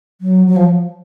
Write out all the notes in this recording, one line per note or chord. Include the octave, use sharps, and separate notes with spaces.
F#3
F#3
F3